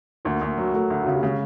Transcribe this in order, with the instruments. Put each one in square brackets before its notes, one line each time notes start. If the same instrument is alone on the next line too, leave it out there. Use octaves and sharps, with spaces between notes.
[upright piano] D2 [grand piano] A#3 A#4
[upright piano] D2
F#3
[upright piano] F#3 [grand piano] A3 A4
[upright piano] D2
[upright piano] C#3 [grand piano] F#4
[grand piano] G4
[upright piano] C#3 [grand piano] G#3 G#4